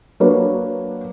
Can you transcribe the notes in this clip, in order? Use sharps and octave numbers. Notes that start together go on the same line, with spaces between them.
F#3 A#3 D4 B4 C#5